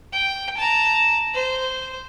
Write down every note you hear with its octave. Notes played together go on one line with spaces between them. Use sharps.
G5
A5 A#5
C5